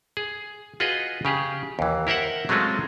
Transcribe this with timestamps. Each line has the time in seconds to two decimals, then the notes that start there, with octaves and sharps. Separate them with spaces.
0.17 G#4
0.80 F4 F#4 G#4 B4 D#5
1.25 C#3 G4 G#4
1.79 D#2 E3
2.07 E4 A#4 C5 E5 F#5
2.49 F#3 G#3 A3 C4 C#4 F4